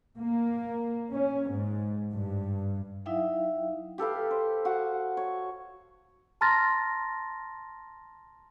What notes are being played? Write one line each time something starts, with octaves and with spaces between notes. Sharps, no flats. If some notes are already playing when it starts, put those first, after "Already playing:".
A#3
C#4
G#2
G2
F#3 D#4 E4 E5 F5 G5
G4 A4 B4 F5
C5
F#4 F5 F#5
C#5
A5 A#5 C6 F6 A6 A#6